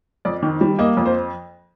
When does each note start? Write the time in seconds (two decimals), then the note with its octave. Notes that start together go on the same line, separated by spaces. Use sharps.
0.25 F2 D5
0.43 D#3
0.61 G3
0.79 A#3 D#5
0.97 F2
1.05 C5